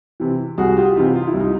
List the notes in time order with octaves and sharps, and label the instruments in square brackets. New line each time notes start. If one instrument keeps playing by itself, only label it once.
[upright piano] C3 E3
C2 F#4 G#4
F4 G4
C3 E3 D#4 F4
F4
E4
C2
D#4